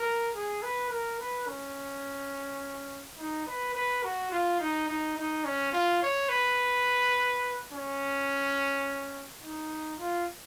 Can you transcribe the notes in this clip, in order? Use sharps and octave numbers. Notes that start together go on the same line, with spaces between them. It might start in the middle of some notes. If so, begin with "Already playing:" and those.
Already playing: A#4
G#4
B4
A#4
B4
C#4
D#4
B4
B4
F#4
F4
D#4
D#4
D#4
C#4
F4
C#5
B4
C#4
D#4
F4